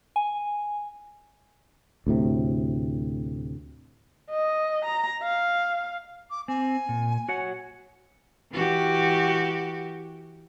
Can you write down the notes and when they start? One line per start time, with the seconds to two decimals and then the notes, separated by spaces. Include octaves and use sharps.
0.16 G#5
2.07 D2 A2 C3
4.30 D#5
4.85 A#5
5.23 F5
6.31 D6
6.48 C4 G#5
6.89 A#2
7.29 F#4 C#5 F#5
8.51 E3 F#4 G4